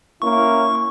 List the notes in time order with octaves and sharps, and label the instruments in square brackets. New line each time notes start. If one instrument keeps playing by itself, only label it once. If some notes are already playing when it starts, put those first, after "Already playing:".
[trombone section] A#3 C#4 E4 [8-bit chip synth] C#6